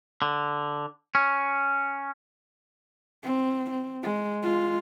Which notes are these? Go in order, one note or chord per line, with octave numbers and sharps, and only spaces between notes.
D3
C#4
C4
C4
G#3
G#3 F4